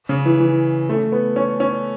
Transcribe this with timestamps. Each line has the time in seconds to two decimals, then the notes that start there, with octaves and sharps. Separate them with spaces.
0.09 C#3
0.25 E3
0.40 E3
0.89 A3
1.12 B3
1.36 C#4
1.60 C#4